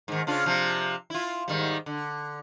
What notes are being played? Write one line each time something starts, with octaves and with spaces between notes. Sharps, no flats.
G#2 D#3
C#3 D4 F4
C3 F3
E4 F4
G#2 D#3 G3
D3